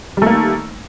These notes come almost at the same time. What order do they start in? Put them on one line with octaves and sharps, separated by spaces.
G3 A3 A#3 D#3